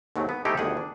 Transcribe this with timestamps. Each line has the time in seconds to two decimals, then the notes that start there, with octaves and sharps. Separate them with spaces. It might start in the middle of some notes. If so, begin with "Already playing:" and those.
0.16 D#2 G#2 F#3 A3
0.29 B3
0.45 F3 A3 D#4 E4 G4 G#4
0.57 G1 D2 D#3 G#4 F#5
0.77 D4